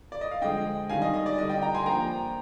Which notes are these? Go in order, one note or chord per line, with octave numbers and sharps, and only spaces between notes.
D5
D#5
F5
D3 F3 G#3 D#5 G5
D#3 G3 D4 F5 G#5
D#5
D#5
D5
D3 G3 D4 D#5
D#5 G5
G5 A#5
G#5 C6
F3 A#3 D4 G5 A#5